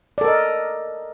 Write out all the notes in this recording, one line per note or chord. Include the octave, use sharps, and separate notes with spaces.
A4 A#4 D5 D#5